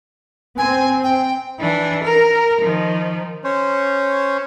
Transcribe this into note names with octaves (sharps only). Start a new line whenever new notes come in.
C4 G#5
G5
E3 D4
A#4
D#3 F3
C#4 C5 C#5